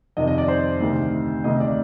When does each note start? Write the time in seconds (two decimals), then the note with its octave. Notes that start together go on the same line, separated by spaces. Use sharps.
0.17 F2 C3 D#3 D#5
0.27 D#5
0.38 D5
0.48 C5
0.80 D2 C3 D#3
1.44 D2 C3 D#3 D#5
1.60 D5